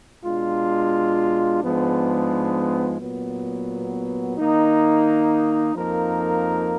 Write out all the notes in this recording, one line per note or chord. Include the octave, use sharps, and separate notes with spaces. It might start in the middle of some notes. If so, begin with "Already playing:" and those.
B2 G#3 D4 F4
G#2 F3 G#3 B3 D4
A#2 F#3 B3
D#3 A#3 D#4
F2 F3 A#3 D#4 A#4